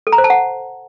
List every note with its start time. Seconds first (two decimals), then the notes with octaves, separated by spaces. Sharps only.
0.07 A4
0.12 A#5
0.18 C5
0.24 A5
0.30 F#5